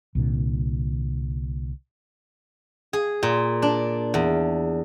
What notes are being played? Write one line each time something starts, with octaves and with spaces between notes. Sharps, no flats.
C2 A#2 D3
G#4
A#2
D4
E2